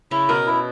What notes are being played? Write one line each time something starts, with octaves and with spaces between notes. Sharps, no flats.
C#3 C#4 E4
B2 B3 A#4
E4